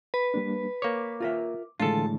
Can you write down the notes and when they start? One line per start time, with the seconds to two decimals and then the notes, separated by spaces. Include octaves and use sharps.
0.14 B4
0.34 G3 A#3 D4
0.82 A#3 C#5 D6
1.20 F4 A#4 E5
1.80 A2 D3 E3 G#3 D4 F4 A4 A5